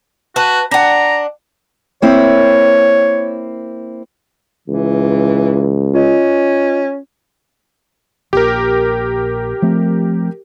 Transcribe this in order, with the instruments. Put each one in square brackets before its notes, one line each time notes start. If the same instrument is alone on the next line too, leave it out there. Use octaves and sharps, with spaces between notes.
[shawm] F#4 [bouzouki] B4 A5
[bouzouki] D4 F#5 [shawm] A#5
[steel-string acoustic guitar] A#3 C4 E4 [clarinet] C#5
[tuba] C#2 [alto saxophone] E3
[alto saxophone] C#4 [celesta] F4 D#5
[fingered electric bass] A#1 A#2 [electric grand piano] G4 A#4
[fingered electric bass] F3 A3 C4